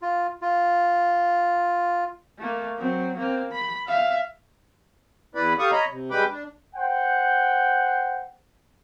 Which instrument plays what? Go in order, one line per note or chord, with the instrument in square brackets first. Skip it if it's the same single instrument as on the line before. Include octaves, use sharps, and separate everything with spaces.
[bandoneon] F4
F4
[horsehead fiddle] A3 A#3
F#3 C4
A#3 C4
B5
E5 F5
[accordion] E2 E4 B4 D5 B5
G4 A4 F5 C#6 D#6
C#5 D#5 A#5 B5
C3
G3 G#3 B4 G5 B5 D6
D4
[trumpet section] C5 F#5 G5